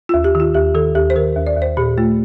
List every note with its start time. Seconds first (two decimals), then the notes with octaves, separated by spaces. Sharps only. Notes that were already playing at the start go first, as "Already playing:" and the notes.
0.09 D#2 F4
0.24 G4
0.35 D#3
0.40 F4
0.55 D#2 G4
0.75 D#3 A4
0.95 D#2 G4
1.10 C5
1.16 D#3 A#4
1.36 D#2
1.47 D5
1.57 D#2 C5
1.77 A#2 G4
1.98 A3 F4